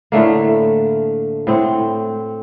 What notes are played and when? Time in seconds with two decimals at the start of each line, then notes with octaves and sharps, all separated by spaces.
0.12 A2 D3 A3 A#3
1.47 A2 C4 F#5